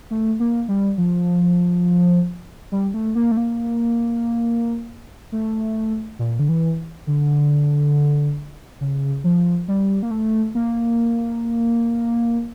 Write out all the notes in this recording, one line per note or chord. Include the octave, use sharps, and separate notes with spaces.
A3
A#3
G3
F3
G3
A3
A#3
A3
A#3
A3
A#2
D3
E3
D3
C#3
F3
G3
A#3
A3
A#3